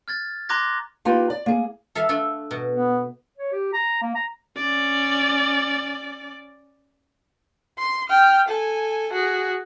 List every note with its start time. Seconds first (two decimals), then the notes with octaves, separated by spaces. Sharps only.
0.08 F6 G#6 A6
0.49 A#5 C6 D6 F#6 G#6 A#6
1.05 A#3 D#4 F4 G4 B4
1.30 D5
1.46 A#3 G#4
1.95 A4 E5 F5
2.09 A3 D4 A4
2.51 B2
2.71 B3
3.38 C#5
3.52 G4
3.73 A#5
4.02 A#3
4.15 A#5
4.57 C#4 D5
7.78 C6
8.09 G5 F6
8.48 A4 G#5
9.13 F#4 G#4